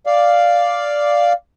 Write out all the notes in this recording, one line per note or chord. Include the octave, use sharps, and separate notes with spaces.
D5 F5